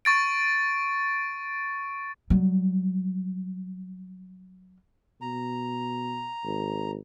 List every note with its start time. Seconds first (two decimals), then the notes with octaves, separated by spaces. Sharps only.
0.05 C#6 A6 D7
2.30 F#3 G3
5.21 B2 A#5
6.45 G#1